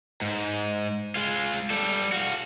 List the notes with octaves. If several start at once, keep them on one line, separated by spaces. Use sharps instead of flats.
G#2
G#3 F4
G3 A4
F#4 F5